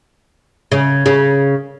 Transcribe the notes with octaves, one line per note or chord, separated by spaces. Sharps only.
C#3
C#3